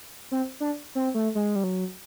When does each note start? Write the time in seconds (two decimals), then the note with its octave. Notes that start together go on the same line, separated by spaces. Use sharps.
0.31 C4
0.60 D4
0.95 C4
1.15 A3
1.35 G#3
1.56 G3
1.64 F#3